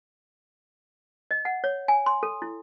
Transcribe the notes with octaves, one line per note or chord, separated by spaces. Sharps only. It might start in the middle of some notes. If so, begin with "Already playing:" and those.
D#5
F#5
C#5
G#5
C6
A4
E4